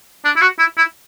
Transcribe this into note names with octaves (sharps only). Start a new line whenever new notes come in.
D4
E4
F#4
E4
E4